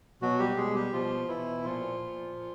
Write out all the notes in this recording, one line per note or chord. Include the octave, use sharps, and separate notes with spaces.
B2 F#3 F#4
G3 G4
B2 G#3 G#4
G3 G4
B2 F3 F4
B2 E3 E4
A#2 F3 F4
A#2
A#2